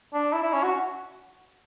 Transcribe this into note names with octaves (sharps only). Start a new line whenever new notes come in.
D4
E4
E4
C#4
F#4